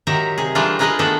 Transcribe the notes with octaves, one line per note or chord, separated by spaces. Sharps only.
D#3 F#3 G4 E5 A#5
C3 G#4
E3 G3 A3 D4 D#4 F4
D4 D#4 G#4 A#4 B4 D#5
D#3 A3 B3 D4 A4 B4